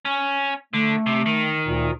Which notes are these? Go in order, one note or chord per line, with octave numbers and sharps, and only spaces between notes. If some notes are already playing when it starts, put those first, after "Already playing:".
C#4
D3 A3
C3
D#3
D2 A#2